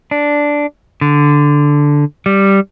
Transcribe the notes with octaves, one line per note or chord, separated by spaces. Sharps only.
D4
D3
G3